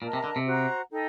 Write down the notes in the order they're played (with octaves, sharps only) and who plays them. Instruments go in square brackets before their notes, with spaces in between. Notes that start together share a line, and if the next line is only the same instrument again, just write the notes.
[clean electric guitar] A#2 [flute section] A#4 D#5 A5
[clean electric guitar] C3
D3
C3
[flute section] F#4 C5 F#5 A#5
D#4 A4 D#5 G5